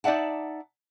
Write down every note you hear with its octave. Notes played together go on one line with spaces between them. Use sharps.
D#4 D5 E5 F#5 A5